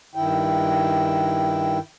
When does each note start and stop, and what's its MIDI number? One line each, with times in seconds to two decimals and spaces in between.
0.15 1.79 43
0.15 1.79 51
0.15 1.79 64
0.15 1.79 79